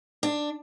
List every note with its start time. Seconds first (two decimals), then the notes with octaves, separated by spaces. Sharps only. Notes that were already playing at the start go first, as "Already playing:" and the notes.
0.23 D4